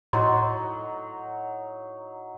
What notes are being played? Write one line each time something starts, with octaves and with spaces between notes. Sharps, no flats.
A2 F#3 D#4 D#5 A#5 C6